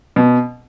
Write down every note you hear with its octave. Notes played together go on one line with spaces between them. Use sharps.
B2